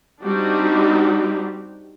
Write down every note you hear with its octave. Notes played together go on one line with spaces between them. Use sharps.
G3 C4 D4 D#4 F#4 G4